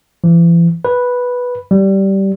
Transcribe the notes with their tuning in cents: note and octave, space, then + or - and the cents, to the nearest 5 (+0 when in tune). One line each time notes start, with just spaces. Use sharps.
E3 +40
B4 -5
G3 -15